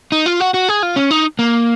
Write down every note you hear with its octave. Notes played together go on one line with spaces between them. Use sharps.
D#4
F4
F#4
F#4
G#4
F4
C#4
D#4
A#3